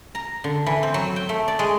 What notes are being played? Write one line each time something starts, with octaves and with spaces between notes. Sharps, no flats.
A#5
D3
E3
C4
F#3
G5
A3
D5
G#3